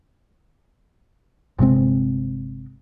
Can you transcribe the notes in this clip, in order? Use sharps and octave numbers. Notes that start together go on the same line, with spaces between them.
G1 C3 G#3 C4